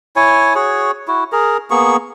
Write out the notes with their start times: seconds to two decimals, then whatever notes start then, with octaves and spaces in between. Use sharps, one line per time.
0.16 E4 C#5 G#5
0.55 F#4 G#4 C#5
1.08 E4 F#4
1.32 G#4 A#4
1.71 A#3 B3 G#4 C#6